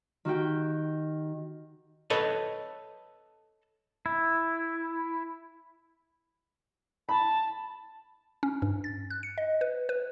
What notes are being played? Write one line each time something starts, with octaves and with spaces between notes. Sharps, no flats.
D#3 F#4 G4 G5
A4 B4 C#5 D#5
E4
A5 B5
C#4
G2
A6
F#6
C#7
D#5
B4
B4